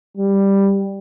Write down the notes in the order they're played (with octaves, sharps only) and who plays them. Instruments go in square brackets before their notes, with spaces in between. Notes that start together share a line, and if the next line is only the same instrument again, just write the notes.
[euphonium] G3